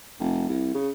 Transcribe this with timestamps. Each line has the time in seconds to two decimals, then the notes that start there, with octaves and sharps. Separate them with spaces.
0.19 F1
0.48 C2
0.75 C#3